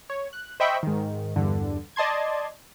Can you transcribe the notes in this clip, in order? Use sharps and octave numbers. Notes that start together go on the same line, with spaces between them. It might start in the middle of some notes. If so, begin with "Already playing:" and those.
C#5
F#6
C5 D#5 E5 G5 B5 C#6
G#2 D#3
E2 G2 D3
D5 D#5 A5 C6 G#6